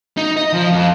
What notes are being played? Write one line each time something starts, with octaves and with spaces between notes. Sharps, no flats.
D#4
D#5
F3
F2